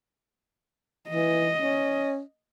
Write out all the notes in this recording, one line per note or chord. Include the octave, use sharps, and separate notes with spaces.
E3 D#5
C#4